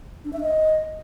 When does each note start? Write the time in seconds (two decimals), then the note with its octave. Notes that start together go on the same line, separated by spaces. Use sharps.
0.25 D4
0.33 E5
0.41 D#5